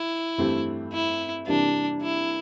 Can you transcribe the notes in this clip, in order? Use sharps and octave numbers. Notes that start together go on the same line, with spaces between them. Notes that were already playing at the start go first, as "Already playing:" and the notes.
Already playing: E3 E4
G2 E3 A3 C4 G4
E4
C3 E3 G3 A#3 D4
E4